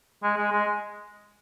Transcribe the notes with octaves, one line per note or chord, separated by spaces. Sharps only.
G#3
G#3
G#3